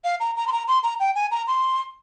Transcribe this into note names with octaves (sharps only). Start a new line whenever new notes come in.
F5
A#5
A#5
C6
A#5
C6
A#5
G5
G#5
A#5
C6